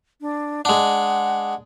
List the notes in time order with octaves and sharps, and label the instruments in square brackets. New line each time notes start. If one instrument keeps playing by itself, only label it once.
[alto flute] D4
[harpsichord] G#3 D4 [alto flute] F#5